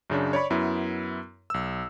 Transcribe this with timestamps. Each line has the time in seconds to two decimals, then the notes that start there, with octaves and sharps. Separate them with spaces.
0.10 F#2 C#3 D4
0.33 C#5 D5 B5 C#6
0.50 F#2 B3 E4
1.50 B1 E6